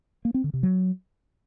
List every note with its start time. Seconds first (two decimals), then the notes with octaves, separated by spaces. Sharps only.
0.25 A#3
0.34 C4
0.44 D3
0.54 C3
0.63 F#3